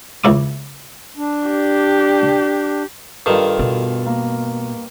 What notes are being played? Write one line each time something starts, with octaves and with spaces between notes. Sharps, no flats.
C#2 E4 D6
D4
G4
G2 D#3 F4 A4
B2
A#3